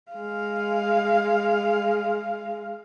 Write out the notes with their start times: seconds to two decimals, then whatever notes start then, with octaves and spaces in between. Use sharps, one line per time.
0.11 G#3 F5